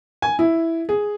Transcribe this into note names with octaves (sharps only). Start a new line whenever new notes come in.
G#5
E4
G#4